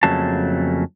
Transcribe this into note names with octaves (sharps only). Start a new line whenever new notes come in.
F2 C#3 F#3 A3 A#3 A5